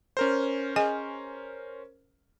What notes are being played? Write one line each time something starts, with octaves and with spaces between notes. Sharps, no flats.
C#4 A#4 C5
G#4 D#5 G#5